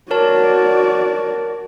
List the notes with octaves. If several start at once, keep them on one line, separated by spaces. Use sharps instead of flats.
F#4 A#4 C#5 D5 A5